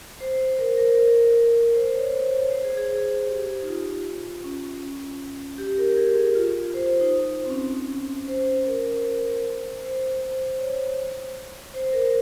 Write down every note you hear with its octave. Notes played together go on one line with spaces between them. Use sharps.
C5
A#4
A#4
A#4
C5
C#5
C5
C#5
C5
G#4
G#4
G4
D#4
F4
C#4
G4
A#4
G#4
F4
C5
C5
D#4
C4
C#4
C5
A#4
C5
C5
C5
C#5
C5
A#4